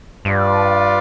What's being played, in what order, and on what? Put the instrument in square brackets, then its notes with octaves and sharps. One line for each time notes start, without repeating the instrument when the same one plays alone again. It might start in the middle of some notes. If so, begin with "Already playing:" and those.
[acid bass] G2 [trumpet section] F4 B4 D5